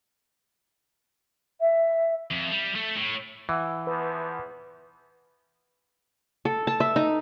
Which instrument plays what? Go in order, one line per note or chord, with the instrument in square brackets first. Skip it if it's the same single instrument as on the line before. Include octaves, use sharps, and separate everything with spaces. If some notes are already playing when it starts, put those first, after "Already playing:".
[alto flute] E5
[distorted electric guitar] F2
G3
A3
A2
[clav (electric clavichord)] E3 [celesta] E5 F#5 E6
[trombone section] E2 F3 B3 [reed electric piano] B4
[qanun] A4
A5
E5
D#4